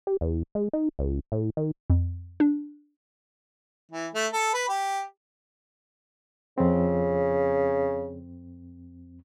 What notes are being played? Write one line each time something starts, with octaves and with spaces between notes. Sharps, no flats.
G4
E2
G#3
D#4
C#2
A2
D#3
F2
D4
E3
A3
A4
B4
G4
F2 C#3 C4